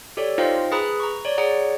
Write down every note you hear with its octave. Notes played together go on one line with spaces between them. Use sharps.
G4 A4 C#5 D5
D#4 F4 C5 D#5 F5 G5
G#4 B4 A#5 B5 D#6 F#6
A#5 C#6
C#5 D5
G#4 C#5 D5 F#5 A#5